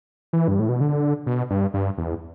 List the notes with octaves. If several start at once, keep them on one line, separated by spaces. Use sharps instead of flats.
E3
G2
A2
B2
D3
B2
G2
G2
E2